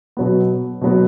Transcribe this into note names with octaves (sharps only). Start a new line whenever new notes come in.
B2 F#3 B3
B2 F#3 B3